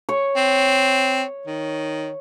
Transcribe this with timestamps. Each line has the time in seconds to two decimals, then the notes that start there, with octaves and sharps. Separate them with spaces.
0.09 C#5
0.36 C4
1.47 D#3